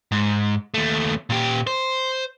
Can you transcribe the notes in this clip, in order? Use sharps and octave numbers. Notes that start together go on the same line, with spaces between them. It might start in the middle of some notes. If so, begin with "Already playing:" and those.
G#2
D#2 A3
A#2 G4
C5